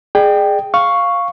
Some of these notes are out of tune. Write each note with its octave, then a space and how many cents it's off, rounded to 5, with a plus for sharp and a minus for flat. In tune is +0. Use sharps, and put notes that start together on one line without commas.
G#4 +0 D5 +45 G5 +0
F5 +0 C#6 +0